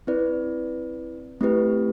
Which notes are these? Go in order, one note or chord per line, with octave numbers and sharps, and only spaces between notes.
C4 E4 B4 D5
A3 C4 E4 G4 B4